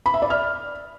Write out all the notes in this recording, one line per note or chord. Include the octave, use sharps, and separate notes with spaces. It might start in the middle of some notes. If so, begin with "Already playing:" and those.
B5
E5
D5
F6